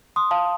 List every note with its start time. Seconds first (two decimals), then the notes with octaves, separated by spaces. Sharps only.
0.16 C6 D#6
0.31 F5 A5